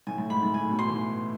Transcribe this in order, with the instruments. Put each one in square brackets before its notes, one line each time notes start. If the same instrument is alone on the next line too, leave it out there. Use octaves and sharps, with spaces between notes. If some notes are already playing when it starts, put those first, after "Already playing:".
[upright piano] A2 [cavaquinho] G#5
[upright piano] A2
[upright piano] G#2 [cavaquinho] B5
[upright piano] A2
[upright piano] A2 [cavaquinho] G#5
[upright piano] B2
[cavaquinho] C6
[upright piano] E3